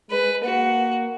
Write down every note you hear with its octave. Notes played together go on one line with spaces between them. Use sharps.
G#3 B4
A#3 F#4